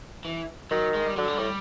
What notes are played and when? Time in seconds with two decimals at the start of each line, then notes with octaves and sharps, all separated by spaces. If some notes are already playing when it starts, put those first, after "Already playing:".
0.25 E3
0.71 D#3 F#3
0.94 G#3
1.06 G3
1.17 D3 F#3
1.28 G3
1.39 A2